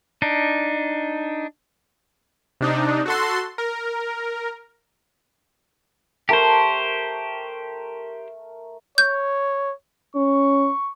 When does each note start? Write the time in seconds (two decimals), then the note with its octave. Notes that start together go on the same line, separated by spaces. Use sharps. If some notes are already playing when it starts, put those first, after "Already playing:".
0.22 D4 D#4
2.61 C3 D4 D#4
3.06 F#4 A4 C6
3.58 A#4
6.29 A3 G4 A#4 C5 C#6
8.98 C#5 G6
10.16 C#4 C#6